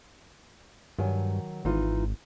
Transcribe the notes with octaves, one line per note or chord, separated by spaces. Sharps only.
G2 D#3 F#3 G#5
G#1 E3 D#4 F4